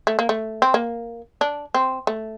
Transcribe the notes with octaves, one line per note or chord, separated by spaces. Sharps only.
A3
A#3
A3
C4
A#3
D4
C4
A3